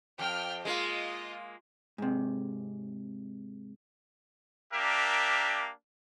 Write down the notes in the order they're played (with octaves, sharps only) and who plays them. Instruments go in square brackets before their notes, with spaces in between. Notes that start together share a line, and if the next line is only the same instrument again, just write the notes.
[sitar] F2 [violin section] G5 F6
[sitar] G#3 A#3 [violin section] F4 D#5
[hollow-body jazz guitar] G#2 C3
[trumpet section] A#3 D4 G4 A#4 E5